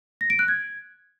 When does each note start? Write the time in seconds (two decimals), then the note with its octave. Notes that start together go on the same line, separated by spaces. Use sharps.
0.21 A#6
0.30 D7
0.39 F#6
0.48 G#6